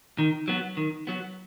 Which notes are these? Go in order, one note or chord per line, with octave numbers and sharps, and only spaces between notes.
D#3
F#3 B3
D#3
F#3 B3